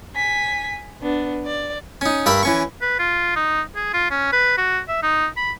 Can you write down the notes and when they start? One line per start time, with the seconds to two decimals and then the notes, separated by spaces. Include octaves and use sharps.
0.15 G#5 B6
1.02 B3 D4
1.46 D5
2.01 C#4 D#4
2.26 G2 A#4 E5 B5
2.43 E3 C#4 C#6
2.82 B4
2.99 F4
3.36 D#4
3.75 G#4
3.93 F4
4.11 C#4
4.32 B4
4.58 F#4
4.88 E5
5.03 D#4
5.37 B5